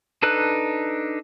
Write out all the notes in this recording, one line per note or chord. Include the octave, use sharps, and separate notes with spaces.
D4 D#4 A4 B4 F#6